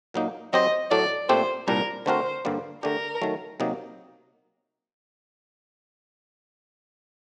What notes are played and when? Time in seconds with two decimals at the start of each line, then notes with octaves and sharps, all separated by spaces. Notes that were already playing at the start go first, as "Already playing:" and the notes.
0.14 A#2 F#3 A#3 D#4
0.53 F#3 C4 G4 C5 D#5
0.91 A2 F#3 A3 D5
1.29 A#2 A3 C4 G4 C5
1.67 C2 A#2 G3 D4 A#4
2.06 D3 A3 C4 F#4 A#4 C5
2.45 G2 D3 G3 A#3
2.83 D3 A3 D4 G4 A#4
3.22 D#3 F#3 A3
3.60 C3 F#3 A#3 D#4